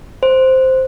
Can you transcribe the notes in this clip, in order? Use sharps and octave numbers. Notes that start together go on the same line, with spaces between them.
C5